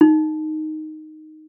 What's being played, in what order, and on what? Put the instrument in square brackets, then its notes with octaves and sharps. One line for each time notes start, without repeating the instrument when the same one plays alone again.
[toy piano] D#4